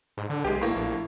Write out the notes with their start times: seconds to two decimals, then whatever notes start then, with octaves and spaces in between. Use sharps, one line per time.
0.17 G#2
0.30 D3
0.44 B1 G#3 G4
0.61 A2 A#3
0.75 A#1